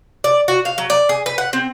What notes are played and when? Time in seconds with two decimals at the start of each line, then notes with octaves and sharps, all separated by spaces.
0.24 D5
0.48 F#4
0.65 F5
0.78 F#3
0.90 D5
1.09 G#4
1.26 B4
1.38 F#5
1.53 C4